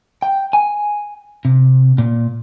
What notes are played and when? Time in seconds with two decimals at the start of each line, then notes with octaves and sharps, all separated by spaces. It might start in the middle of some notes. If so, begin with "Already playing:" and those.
0.22 G5
0.53 G#5
1.45 C3
1.98 A#2